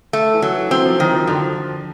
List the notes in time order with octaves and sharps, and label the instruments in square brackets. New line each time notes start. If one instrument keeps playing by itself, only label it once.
[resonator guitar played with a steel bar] A3
[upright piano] E3
[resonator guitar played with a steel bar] F#3
[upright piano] E3
[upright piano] F#3 [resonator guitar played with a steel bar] C4
[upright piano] F3
[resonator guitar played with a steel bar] D#3 [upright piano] F#3
[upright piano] F3
[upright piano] D3 [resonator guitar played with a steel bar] F3